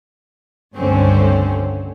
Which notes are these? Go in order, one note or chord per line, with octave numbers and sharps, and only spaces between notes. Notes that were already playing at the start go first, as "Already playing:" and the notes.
C#2 G2 D3 A3 C4 C#4